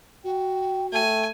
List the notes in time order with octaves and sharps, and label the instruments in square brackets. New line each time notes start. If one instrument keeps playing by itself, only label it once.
[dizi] F#4 [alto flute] G5
[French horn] A3 [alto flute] G5 [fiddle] G#5